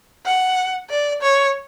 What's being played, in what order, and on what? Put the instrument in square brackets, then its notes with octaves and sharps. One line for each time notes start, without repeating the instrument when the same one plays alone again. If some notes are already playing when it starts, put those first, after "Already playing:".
[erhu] F#5
D5
C#5